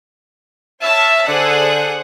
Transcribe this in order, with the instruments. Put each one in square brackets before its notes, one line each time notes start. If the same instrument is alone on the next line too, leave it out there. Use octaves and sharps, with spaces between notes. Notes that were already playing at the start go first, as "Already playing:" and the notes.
[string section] C#5 A5 F6 [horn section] E5
[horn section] D3 A4 D5 [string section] G#4 C5 F#5